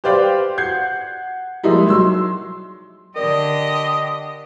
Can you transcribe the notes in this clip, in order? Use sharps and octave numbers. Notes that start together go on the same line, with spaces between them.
G4 B4 C5 D5 F5 G5
F#5 G6 G#6 C7
F3 G3 G#3 A#3 D#4 E4
F#3 C6 E6
D3 G4 A#4 D5 D#5